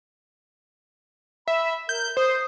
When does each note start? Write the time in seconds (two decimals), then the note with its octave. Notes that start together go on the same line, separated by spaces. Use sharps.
1.48 E5 B5
1.89 A#4 G6
2.17 C5 D#6